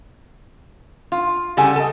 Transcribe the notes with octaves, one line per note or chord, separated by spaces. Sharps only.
F4
C#3 G3 A4 F#5 G#5
A4 D#5